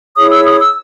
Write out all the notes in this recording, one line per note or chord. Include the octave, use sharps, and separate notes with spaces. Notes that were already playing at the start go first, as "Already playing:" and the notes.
E4 G#4 C#5 D#6
E6
D#6
E6